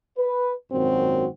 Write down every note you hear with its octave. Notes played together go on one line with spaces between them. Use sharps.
B4
G#1 F#2 A#2 C4 F#4